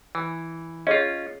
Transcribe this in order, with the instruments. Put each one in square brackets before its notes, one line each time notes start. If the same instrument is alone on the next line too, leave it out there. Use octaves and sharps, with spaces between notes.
[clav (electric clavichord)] E3
[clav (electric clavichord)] C#4 F4 [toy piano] G#4 C#5 D#5